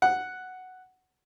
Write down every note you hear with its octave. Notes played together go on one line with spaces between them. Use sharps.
F#5